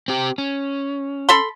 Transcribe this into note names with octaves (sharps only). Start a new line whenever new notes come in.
C4 G4
C#4
A4 B5 C6